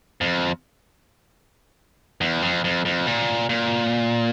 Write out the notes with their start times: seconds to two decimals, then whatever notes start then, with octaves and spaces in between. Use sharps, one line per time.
0.21 F2
2.21 E2
2.42 F2
2.64 F2
2.85 F2
3.07 A#2
3.49 A#2